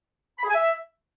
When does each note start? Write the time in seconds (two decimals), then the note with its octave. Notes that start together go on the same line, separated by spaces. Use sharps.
0.38 B5
0.43 G#4
0.49 G#5
0.54 E5